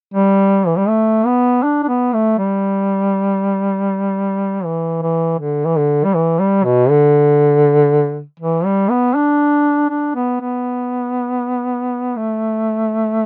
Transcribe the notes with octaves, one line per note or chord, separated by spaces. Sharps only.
G3
E3
G3
A3
B3
D4
D4
B3
A3
G3
E3
E3
D3
E3
D3
G3
E3
G3
B2
D3
E3
G3
B3
D4
D4
B3
B3
A3